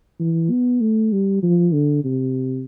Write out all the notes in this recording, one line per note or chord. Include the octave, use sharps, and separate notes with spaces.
E3
B3
A3
G3
F3
D3
C3